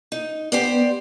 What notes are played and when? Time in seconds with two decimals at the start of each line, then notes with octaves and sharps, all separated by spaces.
0.12 D#4
0.52 B3 G4 C5 D5